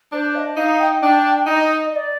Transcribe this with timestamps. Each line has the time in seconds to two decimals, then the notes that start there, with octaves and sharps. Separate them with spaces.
0.12 D4 C5
0.35 F5
0.39 D#5
0.57 D#4 F5
0.80 G5
1.02 D4 G5
1.46 D#4 D#5
1.92 D#5
1.96 D5